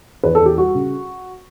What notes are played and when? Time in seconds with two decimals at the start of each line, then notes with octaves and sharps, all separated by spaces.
0.23 E2 B4
0.35 A4
0.41 E2
0.46 G4
0.58 G3 F#4
0.75 C#3